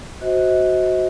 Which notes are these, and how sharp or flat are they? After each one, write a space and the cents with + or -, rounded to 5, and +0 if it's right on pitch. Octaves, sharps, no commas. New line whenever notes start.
F#4 +0 C5 +0 D#5 +35